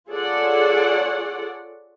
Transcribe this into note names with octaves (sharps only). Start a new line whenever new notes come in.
F4 G#4 A4 C#5 D5 F#5